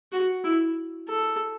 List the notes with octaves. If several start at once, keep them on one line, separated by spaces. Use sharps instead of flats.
F#4
E4
A4